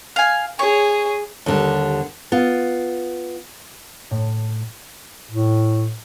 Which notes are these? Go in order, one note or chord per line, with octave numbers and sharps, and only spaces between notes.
F5 G#5
G#4 C#5
D#2 D3 G3
B3 F4
A2
A2